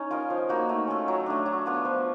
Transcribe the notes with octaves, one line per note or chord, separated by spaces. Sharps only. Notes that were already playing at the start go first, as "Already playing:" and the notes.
Already playing: C#4 D#4
F4 A#4 D#5
F3
A#3 D#4 F#4
A3
C#4 F4 A4
F#3
A3 D4
F#3
B3 D4 F4
F3